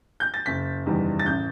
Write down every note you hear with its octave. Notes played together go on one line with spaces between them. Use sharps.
G6
A6
F#1 B6
E2 D#3 G3
A6
A1 G6